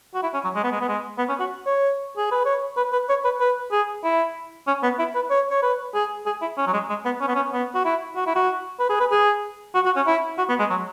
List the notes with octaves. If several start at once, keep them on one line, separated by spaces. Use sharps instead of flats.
F#4
E4
C#4
F#3
G#3
B3
G#3
B3
G#3
B3
C#4
F#4
C#5
G#4
B4
C#5
B4
B4
C#5
B4
B4
G#4
E4
C#4
B3
E4
B4
C#5
C#5
B4
G#4
G#4
E4
C#4
F#3
G#3
G#3
B3
C#4
B3
C#4
B3
F#4
E4
F#4
E4
F#4
B4
G#4
B4
G#4
F#4
F#4
C#4
E4
F#4
B3
G#3
F#3